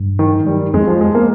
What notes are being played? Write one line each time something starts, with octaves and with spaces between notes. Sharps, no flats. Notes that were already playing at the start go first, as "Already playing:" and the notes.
Already playing: G2
D#3
G3
F2 G#3
F3
G#3
A#3